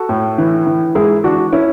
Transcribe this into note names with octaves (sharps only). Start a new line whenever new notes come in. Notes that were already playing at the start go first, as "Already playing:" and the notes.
Already playing: F#4 A4
A2
E3
E3
G#2 E4 G#4
E3 D4 F#4
C#4 E4